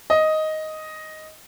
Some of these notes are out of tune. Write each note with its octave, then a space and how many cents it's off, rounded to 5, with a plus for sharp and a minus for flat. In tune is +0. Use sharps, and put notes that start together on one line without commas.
D#5 +5